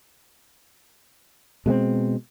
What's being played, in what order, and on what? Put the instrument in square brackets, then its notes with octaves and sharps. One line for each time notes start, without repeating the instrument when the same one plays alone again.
[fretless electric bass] B2 G#3 A3 C4